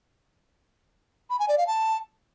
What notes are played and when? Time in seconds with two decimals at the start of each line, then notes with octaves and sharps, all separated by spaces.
1.30 B5
1.39 G#5
1.49 D5
1.58 F5
1.67 A5